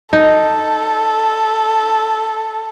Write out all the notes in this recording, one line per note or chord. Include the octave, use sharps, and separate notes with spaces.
D#4 A4